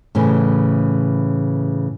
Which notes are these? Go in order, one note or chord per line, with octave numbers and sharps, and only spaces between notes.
A2 C#3 E3